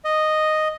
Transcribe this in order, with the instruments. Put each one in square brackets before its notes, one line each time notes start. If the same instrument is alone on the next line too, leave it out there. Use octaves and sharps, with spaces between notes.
[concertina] D#5